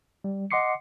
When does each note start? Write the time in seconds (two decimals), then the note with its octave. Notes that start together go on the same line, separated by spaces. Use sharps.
0.24 G3
0.51 D#5 F#5 C6 D6 C7 C#7